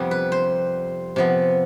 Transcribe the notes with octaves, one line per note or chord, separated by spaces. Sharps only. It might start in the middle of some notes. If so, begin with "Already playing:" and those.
Already playing: F2 C3 G3 B3
B4
C5
C3 F3 B3